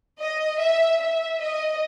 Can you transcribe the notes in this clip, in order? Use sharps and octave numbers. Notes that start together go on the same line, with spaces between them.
D#5
E5
E5
D#5